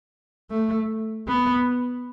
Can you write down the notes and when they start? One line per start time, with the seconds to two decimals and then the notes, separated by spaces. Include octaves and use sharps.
0.51 A3
1.28 B3